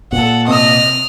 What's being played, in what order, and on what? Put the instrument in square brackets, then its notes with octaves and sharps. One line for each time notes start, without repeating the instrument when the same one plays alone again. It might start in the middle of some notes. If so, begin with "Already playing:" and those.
[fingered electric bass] A#2 [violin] A4 F#5
[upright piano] C3 [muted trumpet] D#5 [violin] D#6 F6